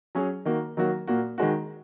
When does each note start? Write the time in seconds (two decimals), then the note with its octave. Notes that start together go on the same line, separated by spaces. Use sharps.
0.15 F#3 C#4 G#4
0.45 D#3 A#3 F#4
0.77 D#3 F#3 A#3 F#4
1.07 A#2 A#3 F#4
1.38 D#3 G#3 F#4